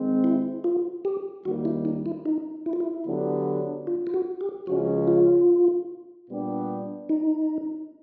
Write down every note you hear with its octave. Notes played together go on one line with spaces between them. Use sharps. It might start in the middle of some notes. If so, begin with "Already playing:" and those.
Already playing: D#3 G#3 C4
E4
F4
G4
D#2 D#3 G3 A#3 F#4
E4
D#4
E4
D#4
E4
F4
E4
D3 F#3 B3 D4 G4
F4
F4
F#4
G4
C#2 C#3 F3 G#3 C#4 F#4
F4
A#2 G3 B3 D4 G4
D#4